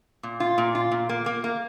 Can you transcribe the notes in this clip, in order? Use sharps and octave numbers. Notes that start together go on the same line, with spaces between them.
A#2
F4
A#2
F4
A#2
A#3
A#3
A#3